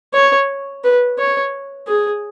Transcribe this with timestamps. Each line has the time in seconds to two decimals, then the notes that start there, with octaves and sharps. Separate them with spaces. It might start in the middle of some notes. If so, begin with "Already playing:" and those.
0.14 C#5
0.84 B4
1.18 C#5
1.87 G#4